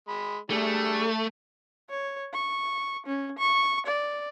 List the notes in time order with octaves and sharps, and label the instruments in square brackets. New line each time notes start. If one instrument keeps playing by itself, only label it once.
[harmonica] G#3 B5
[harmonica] G3 D4 G#4 [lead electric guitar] A3
[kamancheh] C#5
C#6
C#4
C#6
D5